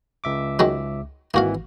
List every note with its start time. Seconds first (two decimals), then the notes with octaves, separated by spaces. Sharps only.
0.24 C#2 E5 D6
0.59 D#3 F#3 G#3
1.34 G#1 E3 A#3 F#4 F5